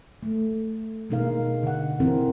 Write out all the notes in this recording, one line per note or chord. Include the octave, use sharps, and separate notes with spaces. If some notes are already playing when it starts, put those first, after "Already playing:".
A3
B2 G#3 A#3 D#4 A#4 F5
D3 F#5
E3 C4 E4 A#4